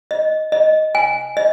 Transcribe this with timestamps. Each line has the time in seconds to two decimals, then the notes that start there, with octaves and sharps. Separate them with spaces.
0.11 D#5
0.52 D#5
0.95 G#5
1.37 D#5